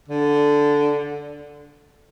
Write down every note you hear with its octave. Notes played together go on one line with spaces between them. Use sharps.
D3